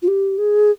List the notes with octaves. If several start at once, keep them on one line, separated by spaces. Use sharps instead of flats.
F4
G4
G#4